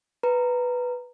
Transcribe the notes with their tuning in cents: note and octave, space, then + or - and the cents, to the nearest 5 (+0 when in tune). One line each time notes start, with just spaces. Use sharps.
B4 +0 A#5 -10